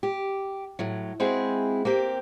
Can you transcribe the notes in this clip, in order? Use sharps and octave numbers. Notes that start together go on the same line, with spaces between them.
G4
A2 F#3
G#3 C4 E4 F#4 G#4
A#3 C4 G4